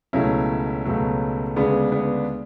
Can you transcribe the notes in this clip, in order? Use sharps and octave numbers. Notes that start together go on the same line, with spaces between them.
C#2 B2 F#3 A3 C#4 E4
C#2 B2 F#3 A3
D2 C#3 G#3 B3 D4
B3 D4